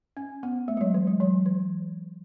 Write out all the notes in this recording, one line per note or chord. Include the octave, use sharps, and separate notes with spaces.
C#4
B3
A3
G#3
F#3
E3
G#3
F#3
E3